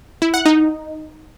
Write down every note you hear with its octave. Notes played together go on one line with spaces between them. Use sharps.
E4
F#5
D#4